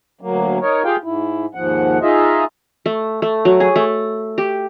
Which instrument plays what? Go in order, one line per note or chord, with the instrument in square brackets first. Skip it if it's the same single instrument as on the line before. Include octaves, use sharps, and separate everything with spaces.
[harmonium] D2 F#3 A#3
D#4 A#4 C#5
F4 G4 G#4 F5 G5
G#2 E4
D#2 G#2 F3 F#5
D#4 F4 G#4 D#5 E5
[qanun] A3
A3
F#3
G#4
A3
G4